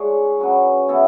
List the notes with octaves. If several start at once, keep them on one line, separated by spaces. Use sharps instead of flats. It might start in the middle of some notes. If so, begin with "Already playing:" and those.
Already playing: G#3 D4 G#4 C#5
F#3 C#4 F#4 B4
E3 B3 E4 A4